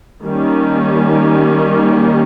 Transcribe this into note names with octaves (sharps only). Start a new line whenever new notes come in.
D#3 G3 A#3 C#4